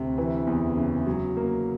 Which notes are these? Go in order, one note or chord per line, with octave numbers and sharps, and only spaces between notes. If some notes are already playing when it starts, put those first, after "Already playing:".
Already playing: D2 C3
E3
E2
C#3
F#3
A#3